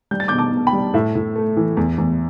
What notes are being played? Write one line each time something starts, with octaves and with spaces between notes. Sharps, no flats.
G3 G6
A6
B2 D6 G6
A5 D6
B2
G5 B5
G3
A2 E5
A2
A3
E3
E2
E2